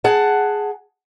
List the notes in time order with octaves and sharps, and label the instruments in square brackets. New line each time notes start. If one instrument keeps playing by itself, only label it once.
[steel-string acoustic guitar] G#4 F#5 A5